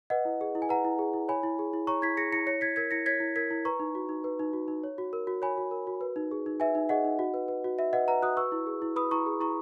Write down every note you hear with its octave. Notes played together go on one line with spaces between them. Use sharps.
B4 D#5 F#5
E4
G#4
E4
G#5
B4 F#5 A#5
E4
G#4
E4
C#5 G#5 B5
E4
G#4
E4
C#5 A#5 C#6
E4 G#6 B6
G#4 A#6 C#7
E4 A#6 C#7
C#5 A#6 C#7
E4 G#6 B6
A#4 G#6 B6
E4 A#6 C#7
C#5 G#6 B6
E4
A#4 G#6 B6
E4
B4 A#5 C#6
D#4
F#4
D#4
B4
D#4
F#4
D#4
C#5
F#4
A#4
F#4
C#5 G#5 B5
F#4
A#4
F#4
B4
D#4
G#4
D#4
B4 E5 G#5
D#4
G#4 D#5 F#5
D#4
F#4
B4
B4
F#4
F#4 E5
B4 D#5 F#5
B4 F#5 A#5
F#4 D#6 F#6
B4 C#6 E6
E4
G#4
E4
B4 B5 D#6
E4 A#5 C#6
G#4
E4 A#5 C#6